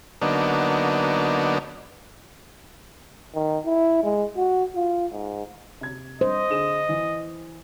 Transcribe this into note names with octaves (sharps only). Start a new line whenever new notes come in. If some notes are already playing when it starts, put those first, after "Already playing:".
D3 F#3 A#3 B3 D4 D#4
D#3
E4
G#3
F#4
F4
G#2
C3 G#6
G2 C5 D#5
D3 G#4 E7
E3